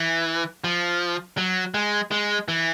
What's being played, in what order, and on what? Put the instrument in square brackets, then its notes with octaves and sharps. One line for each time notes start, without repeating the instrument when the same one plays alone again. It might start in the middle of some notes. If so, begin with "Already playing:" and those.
Already playing: [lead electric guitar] E3
F3
F#3
G#3
G#3
E3